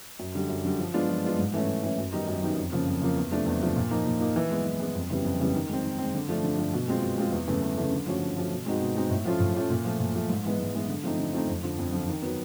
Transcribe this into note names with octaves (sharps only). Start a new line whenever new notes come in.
F#2
D3 G3
F#2
D3 G3
F3
G#3 B3 D4 F4
F3
G#3 B3 D4 F4
G#2
E3 A3 C#4
G#2
E3 A3 C#4
F#2
D#3 G3 B3 D#4
F#2
D#3 G3 B3 D#4
F2
C#3 F3 A#3
F2
C#3 F3 A#3
E2
C3 F3 A3 D4
E2
C3 F3 A3 D4
A#2
F3 A#3 D#4
A#2
F3 A#3 D#4
E3
G#3 B3
E3
G#3 B3
F2
C#3 E3 G3 B3
F2
C#3 E3 G3 B3
D#3
G#3 C4
D#3
G#3 C4
D3
F3 A3 D4
D3
F3 A3 D4
B2
G#3 C4 F4
B2
G#3 C4 F4
E2
C#3 E3 A3
E2
C#3 E3 A3
D3
F3 A3 C#4 F#4
D3
F3 A3 C#4 F#4
B2
G#3 C4 D#4 F#4
B2
G#3 C4 D#4 F#4
A2
F3 A3 C#4 F4
A2
F3 A3 C#4 F4
A#2
F3 A3
A#2
F3 A3
G#2
E3 G#3 B3
G#2
E3 G#3 B3
D3
F3 A3 C4 D#4
D3
F3 A3 C4 D#4
F2
D3 F3
F2
D3 F3
D#3
F#3 B3